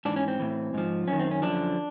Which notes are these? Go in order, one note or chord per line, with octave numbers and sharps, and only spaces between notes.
G#2 E3 D4
C#4
C4
A2 E3
G#2 F3
F#2 D#3 C#4
C4
C#4
F#2 D3 F3 D4